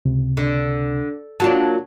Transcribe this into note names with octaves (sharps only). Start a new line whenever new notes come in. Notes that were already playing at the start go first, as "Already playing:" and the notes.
C#2 C3
D3
F#3 A#3 D4 F4 F#4 A5